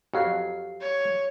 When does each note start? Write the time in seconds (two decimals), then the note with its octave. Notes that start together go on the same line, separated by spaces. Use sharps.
0.14 F2 F#3 G4 F5 C7
0.81 C#5